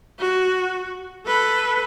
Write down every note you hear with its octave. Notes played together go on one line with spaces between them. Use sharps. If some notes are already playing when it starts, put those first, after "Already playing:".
F#4
A4 B4